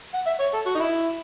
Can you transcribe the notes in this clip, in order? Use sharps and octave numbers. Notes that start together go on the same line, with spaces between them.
F#5
E5
C#5
A4
F#4
D#4
E4